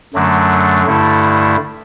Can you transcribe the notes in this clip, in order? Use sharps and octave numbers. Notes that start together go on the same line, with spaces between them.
F#2 D3 F#3 A3 D4
G2 D3 A3 E4